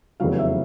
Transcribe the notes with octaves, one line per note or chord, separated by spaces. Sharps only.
F1 E2 C#3 F#3 F5
E5